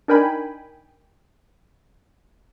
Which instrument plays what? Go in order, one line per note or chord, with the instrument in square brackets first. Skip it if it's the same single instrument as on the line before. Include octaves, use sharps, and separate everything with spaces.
[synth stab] D4 D#4 A#4 G5 G#5 B5